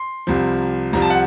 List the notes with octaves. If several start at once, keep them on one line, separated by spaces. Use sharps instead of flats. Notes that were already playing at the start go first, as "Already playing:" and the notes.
Already playing: C6
C2 C3 F3
C2 C3 F3 A#5
A5
F#5